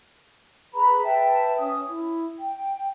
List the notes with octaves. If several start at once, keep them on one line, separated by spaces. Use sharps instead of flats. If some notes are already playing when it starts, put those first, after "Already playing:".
G#4 B4 A#5 B5
B4 E5 G5 A5
C#4 D#6
E4
G5